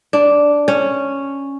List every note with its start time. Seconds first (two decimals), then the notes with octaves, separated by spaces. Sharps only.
0.13 D4
0.68 C#4